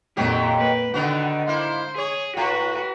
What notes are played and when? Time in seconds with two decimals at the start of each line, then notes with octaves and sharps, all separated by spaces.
0.17 F2 A#2 D#3 F#3 G4
0.58 A#3 B4
0.94 D3 D#3 B3 F#4
1.47 A#3 E4 C5
1.98 G#4 C#5
2.37 A2 F#4 B4